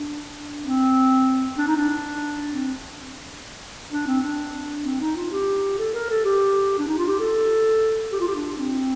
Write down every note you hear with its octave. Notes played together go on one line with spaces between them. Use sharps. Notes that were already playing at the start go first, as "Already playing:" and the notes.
Already playing: D4
C4
D4
D#4
D4
C4
D4
C4
D4
C4
D#4
F4
G4
A4
A#4
A4
G4
D4
D#4
F4
G4
A4
G4
F4
G4
D4
C4